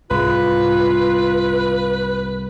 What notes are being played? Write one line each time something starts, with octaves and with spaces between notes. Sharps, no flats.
C2 G#2 F4 B4